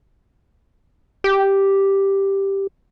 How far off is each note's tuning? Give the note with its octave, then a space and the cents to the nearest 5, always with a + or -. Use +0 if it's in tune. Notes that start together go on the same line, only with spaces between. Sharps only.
G4 +0